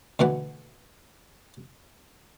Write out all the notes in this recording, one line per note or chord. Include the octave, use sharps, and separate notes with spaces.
D2 B2 E3 F#5